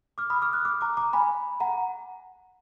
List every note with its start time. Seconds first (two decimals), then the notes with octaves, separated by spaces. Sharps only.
0.18 D6 F6
0.30 B5 D#6
0.42 D6 F6
0.53 D#6 F#6
0.65 D6 F6
0.81 A#5 D6
0.97 A#5 D6
1.13 G#5 B5
1.60 F#5 A#5